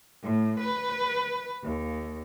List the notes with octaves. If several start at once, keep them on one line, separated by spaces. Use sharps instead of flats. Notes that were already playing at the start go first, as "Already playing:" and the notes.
A2
B4
D#2